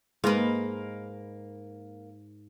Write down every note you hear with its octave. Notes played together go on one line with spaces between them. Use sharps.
G#2 A#3 B4